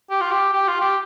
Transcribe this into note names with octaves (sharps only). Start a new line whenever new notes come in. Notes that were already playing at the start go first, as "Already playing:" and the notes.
G4
F4
G4
G4
F4
G4